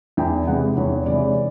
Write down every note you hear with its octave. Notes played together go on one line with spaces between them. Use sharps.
E2 G5
C3 E3 G#3 F#5
E2 C#5
C3 E3 G#3 D5